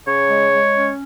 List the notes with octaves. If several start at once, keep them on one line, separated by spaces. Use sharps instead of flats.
C#3 C#5
G#3
G#3
C#4